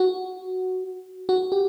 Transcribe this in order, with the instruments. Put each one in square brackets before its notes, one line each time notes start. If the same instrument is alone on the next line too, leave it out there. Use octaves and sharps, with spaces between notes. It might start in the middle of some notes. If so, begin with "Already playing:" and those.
Already playing: [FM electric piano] F#4
F#4
G4